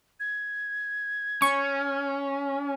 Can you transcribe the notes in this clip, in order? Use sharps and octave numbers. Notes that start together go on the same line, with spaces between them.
G#6
C#4 C#6